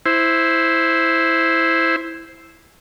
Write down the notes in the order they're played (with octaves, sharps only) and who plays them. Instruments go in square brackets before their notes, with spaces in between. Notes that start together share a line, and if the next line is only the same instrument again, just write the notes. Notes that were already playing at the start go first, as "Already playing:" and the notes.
[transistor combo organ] E4 C5